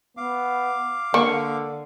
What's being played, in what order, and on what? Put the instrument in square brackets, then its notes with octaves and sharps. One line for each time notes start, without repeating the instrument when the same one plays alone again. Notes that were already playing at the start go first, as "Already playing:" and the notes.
[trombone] B3 [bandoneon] F5 D6
[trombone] D3 [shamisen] A#3 [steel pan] C#6